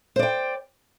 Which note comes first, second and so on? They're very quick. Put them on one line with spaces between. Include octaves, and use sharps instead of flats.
C5 D5 G5